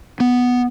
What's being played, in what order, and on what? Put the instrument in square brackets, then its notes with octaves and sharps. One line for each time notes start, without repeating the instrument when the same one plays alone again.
[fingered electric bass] B3